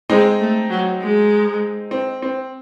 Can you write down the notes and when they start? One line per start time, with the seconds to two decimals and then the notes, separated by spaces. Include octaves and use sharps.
0.10 G#3 C4 D#4
0.40 A3
0.69 F#3
1.00 G#3
1.91 C4
2.22 C4